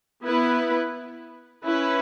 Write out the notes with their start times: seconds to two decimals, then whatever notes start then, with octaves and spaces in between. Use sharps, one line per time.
0.25 B3 E4 B4
1.66 C#4 E4 B4